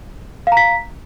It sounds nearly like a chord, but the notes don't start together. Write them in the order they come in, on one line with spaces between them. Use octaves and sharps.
F5 A#5 B6